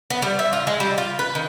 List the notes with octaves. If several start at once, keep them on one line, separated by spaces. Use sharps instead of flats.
B3
G3
E5
F4
G#3
G3
F4
B4
D#3